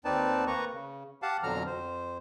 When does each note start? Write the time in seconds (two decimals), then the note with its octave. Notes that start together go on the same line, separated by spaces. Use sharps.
0.05 D#2 C4 D#4 B4 D5 A5
0.47 A#3 B4 A#5 C#6
0.73 C#3
1.22 G4 F5 F#5 A5
1.43 F2 B2 D3 F#3 A#5 F6
1.66 F2 C5